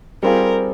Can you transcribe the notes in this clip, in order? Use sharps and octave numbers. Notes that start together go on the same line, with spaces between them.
G3 C4 F4 G#4 A#4